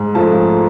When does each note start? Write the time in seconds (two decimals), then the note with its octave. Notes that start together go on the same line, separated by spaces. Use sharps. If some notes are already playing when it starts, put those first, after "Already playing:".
Already playing: G#2
0.15 F3 A3 A5